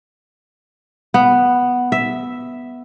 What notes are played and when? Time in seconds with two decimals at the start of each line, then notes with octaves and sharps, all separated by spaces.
1.14 B3
1.92 E5